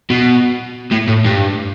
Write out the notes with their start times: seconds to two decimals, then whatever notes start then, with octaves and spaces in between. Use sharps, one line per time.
0.10 B2
0.92 A2
1.08 A2
1.26 G2